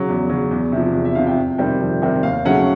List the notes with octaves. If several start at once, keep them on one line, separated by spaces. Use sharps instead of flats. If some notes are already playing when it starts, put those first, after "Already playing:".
Already playing: C#3 F#3
E2
C#3 F#3
E2
C3 F3
E2
E5
C3 F3 F5
G5
F2
C3 D#3 G3 C4
F2
C3 D#3 G3 C4
D#2 F5
C#3 F#3 A3 C#4 F#5